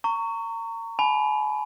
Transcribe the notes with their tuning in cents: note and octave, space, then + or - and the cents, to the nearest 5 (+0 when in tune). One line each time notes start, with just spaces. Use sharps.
A#5 -30 C#6 +10
G#5 +40 B5 +10